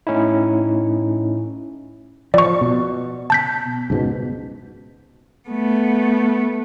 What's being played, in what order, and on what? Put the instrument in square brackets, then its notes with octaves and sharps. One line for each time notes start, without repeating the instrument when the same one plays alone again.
[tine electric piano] A2 C#4 D#4 E4
[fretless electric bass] F3 [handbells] D5 C#6
[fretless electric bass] B2
[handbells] A5 G6 B6
[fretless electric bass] C#2 G#2 B2
[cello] A3 B3